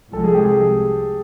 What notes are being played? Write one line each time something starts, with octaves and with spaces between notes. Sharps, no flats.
C2 C3 F3 G#3 A4
G#4
G4
G#4